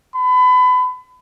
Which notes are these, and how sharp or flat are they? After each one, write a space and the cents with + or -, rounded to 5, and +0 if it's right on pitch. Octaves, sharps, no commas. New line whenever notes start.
B5 +30